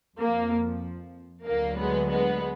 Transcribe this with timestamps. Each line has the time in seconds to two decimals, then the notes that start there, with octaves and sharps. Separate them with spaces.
0.17 F2 F3 A#3
1.45 D2 D3 F#3 A#3
1.77 G#3 B3
2.09 G#3 B3